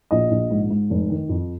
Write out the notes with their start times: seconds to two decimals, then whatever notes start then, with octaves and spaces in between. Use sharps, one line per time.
0.11 A#1 D#5
0.31 A#1
0.50 G#2
0.70 G#2
0.90 F1
1.10 D#3
1.29 F2